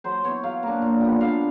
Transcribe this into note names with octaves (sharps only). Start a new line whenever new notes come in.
F#3 C5
B3 E4 C#5
F#3 F5
A#3 D4
A#2
G3 B3
D3 F5